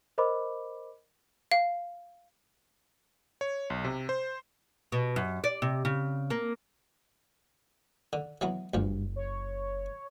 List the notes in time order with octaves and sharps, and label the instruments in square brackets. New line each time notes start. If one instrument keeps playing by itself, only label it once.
[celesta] A#4 C5 D#5 B5 D6
[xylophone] F5
[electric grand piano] C#5
B1
C3
C5
[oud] B2
F#2
D5
C3
C#3
A#3
[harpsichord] D3
[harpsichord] E3 F#3 B3 [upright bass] G#3
[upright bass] F#1 [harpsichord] D2 F3 [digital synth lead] G2
[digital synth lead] C#5